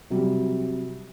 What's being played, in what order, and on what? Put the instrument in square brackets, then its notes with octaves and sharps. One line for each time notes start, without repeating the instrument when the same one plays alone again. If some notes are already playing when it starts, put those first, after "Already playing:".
[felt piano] C3 F#3 G3